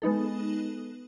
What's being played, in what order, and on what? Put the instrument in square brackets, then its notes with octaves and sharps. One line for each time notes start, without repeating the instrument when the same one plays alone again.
[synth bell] G#3 B3 D#4 A4